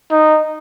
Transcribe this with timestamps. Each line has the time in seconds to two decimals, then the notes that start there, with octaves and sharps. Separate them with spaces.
0.11 D#4